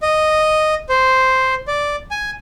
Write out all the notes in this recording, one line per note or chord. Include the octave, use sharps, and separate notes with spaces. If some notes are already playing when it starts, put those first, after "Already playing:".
D#5
C5
D5
G#5